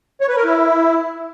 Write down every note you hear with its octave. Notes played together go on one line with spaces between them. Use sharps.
C#5
B4
A#4
E4